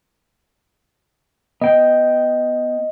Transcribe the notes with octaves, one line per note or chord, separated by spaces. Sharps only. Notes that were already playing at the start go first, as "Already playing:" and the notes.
B3 D#5 G5